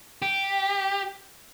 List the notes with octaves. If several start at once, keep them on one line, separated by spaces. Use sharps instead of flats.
G4